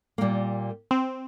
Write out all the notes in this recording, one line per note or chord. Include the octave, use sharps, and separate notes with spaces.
A#2 G3 A#3
C4